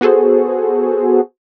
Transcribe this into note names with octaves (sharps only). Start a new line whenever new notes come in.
B3 F#4 G#4 A4 C5